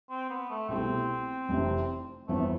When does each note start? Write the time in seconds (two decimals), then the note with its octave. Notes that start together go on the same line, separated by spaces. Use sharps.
0.10 C4
0.30 B3
0.50 A3
0.69 C2 B2 A3 C4 E4
1.49 F1 F2 C3 E3
2.28 G1 F2 E3 A3 B3